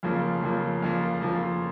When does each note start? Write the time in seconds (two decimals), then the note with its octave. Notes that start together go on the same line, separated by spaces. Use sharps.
0.03 F2 C#3 F3 A#3
0.43 F2 C#3 F3 A#3
0.82 F2 C#3 F3 A#3
1.21 F2 C#3 F3 A#3